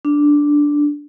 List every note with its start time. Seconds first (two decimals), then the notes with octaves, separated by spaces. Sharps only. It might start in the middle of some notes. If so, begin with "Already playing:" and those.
0.05 D4